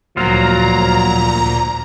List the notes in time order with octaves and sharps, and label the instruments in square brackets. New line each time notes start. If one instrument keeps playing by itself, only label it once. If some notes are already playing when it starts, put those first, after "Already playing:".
[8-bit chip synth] D2 A#2 [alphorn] F3 [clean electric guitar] F#3 F4 [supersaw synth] A#5